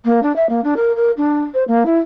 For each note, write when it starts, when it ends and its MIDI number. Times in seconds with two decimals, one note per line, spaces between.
0.05 0.20 58
0.23 0.35 62
0.36 0.47 76
0.49 0.61 58
0.64 0.74 62
0.76 0.92 70
0.96 1.12 70
1.17 1.43 62
1.54 1.64 72
1.68 1.84 58
1.86 1.98 64